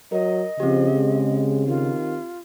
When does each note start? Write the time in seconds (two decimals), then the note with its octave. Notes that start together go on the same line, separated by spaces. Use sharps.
0.12 F#3 A#4 D#5
0.60 C#3 F3 C4 G4
0.95 G#3
1.67 D#3 F4